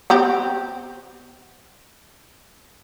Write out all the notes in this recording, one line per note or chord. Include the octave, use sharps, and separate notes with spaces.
B3 C4 G4